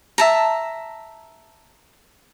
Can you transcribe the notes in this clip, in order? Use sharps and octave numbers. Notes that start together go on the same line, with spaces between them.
E5 A5 A#5